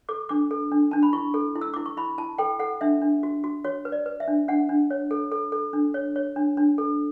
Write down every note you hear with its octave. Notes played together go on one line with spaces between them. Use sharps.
A4 D6
D4 D6
A4
D4
D4 A5
B5
E4 C#6
A4
E4
E6
E4 D6
C#6
E4 B5
E4 A5
A4 G5
A4 F#5
D4 E5
D4
F#4
F#4
F#4 C#5
B4
D5
B4
E5
D4
D4 F#5
D4
C#5
A4
A4
A4
D4
C#5
C#5
D4
D4
A4